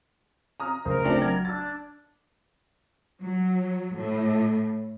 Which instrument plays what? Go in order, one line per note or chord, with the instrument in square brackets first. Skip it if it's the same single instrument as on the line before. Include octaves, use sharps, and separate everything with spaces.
[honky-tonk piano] A#5 D#6 F6
[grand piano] F1 C#3 C5 [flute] A#4
[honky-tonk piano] A3 C4 D4
[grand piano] F#3 [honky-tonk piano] G#6
[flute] D4 [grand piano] E6 F6 A6
[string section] F#3
A2